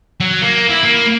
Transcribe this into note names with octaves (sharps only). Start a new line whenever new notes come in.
F#3
A#3
E4
A#3